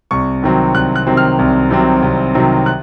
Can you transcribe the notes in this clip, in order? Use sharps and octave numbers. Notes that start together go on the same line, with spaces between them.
C2 C#6
C3 D#3 F#3 C4
C2 F#6
F#6
C3 D#3 F#3 C4
F6
C2
C3 D#3 F#3 C4
C2
C3 D#3 F#3 C4
F#6